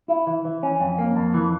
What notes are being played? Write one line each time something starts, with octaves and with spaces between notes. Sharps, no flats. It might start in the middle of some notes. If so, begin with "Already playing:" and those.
E4
E3
E3
C#4
F2
A#3
F2
E3